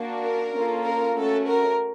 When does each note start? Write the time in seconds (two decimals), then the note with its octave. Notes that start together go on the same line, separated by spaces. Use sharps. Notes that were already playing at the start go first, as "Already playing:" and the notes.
Already playing: A#3 D4 F#4
0.22 A#4
0.53 A#3 C#4 F4 A4
0.84 A#4
1.15 A3 C#4 F#4 A4
1.47 A#4